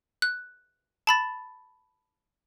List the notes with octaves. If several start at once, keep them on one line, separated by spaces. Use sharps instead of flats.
F#6
A5 B5 A6